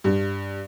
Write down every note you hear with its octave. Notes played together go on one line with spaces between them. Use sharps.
G2